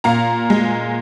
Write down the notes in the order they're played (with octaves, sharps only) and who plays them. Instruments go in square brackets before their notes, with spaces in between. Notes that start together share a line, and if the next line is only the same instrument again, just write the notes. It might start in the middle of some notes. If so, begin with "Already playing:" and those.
[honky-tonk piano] A#2 F5 A#5
G#3